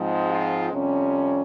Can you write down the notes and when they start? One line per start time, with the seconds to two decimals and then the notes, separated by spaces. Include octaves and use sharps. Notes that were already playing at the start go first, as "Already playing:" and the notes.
Already playing: G#2 F3 G#3 C4
0.29 F4
0.72 F2 C3 G3 C#4